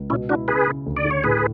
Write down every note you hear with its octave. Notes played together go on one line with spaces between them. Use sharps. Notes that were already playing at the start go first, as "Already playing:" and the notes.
Already playing: C#2
B2 C#4 E4
D4 E4 F#4
C#3 G#4 B4
C#3
D2
D5
D3
C#5
A2 G#4 B4